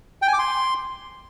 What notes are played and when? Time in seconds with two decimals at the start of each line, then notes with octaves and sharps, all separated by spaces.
0.22 G5
0.28 G#5
0.33 D6
0.39 C6